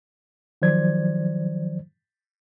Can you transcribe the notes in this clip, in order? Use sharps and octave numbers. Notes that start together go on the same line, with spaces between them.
D#3 F3 F#3 C5 D5 G#6